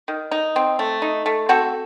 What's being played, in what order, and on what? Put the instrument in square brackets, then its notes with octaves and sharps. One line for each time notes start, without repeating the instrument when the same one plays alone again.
[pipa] D#3
D#4
C4
A3
D#4
A3
C4 F#4 A4